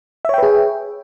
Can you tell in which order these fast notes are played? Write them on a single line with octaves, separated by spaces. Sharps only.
E5 C#5 G5 B4 G#4